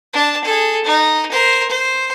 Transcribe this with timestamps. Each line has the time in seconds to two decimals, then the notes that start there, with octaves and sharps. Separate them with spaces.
0.13 D4 A5
0.44 G#4 A4
0.85 D#4
1.31 A#4 C5
1.69 C5